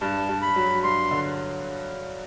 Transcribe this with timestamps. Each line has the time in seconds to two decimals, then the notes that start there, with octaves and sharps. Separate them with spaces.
0.01 G2 A5
0.29 G2
0.42 B5
0.56 F#3
0.83 G2 C6
1.11 D3